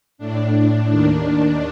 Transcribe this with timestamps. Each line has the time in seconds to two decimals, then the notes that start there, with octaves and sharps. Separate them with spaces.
0.18 A2 D4
0.89 D#2 D#3 D4